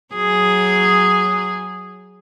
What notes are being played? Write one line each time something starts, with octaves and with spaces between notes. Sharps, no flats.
F#3 G#4